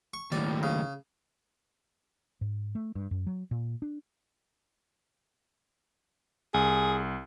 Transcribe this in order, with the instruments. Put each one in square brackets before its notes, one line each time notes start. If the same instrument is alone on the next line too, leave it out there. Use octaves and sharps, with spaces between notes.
[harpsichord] C#6
[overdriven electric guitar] D#2 A2 [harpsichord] D5
[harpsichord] C#3
[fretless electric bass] G#2
A3
G2
F#2
F#3
A#2
D4
[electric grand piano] C2 [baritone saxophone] G#4